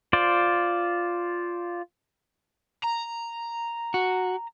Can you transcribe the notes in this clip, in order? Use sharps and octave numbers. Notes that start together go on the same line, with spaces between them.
F4 C5 D5
A#5
F#4